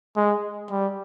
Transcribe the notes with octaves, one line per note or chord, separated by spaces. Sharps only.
G#3
G3